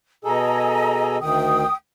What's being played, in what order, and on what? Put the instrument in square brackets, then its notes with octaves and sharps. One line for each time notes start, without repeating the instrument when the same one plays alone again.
[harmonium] B2 G#4 A4 [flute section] D#5 G#5 A#5
[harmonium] D2 D#3 [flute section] G5 D#6